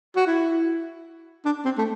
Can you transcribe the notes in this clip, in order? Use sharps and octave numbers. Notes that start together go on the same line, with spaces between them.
F#4
E4
D4
C4
A3